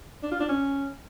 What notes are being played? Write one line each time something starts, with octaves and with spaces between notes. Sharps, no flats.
D4
F4
D4
C#4